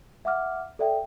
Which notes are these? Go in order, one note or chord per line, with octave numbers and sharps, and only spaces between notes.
E5 F#5 D6 F6
A4 D5 E5 G5